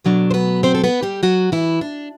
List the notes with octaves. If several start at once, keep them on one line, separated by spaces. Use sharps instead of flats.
B2 F#3 A3 D4
C5
B3 B4
C4 C5
A4
B3 B4
G3 G4
F#3 F#4
E3 E4
D4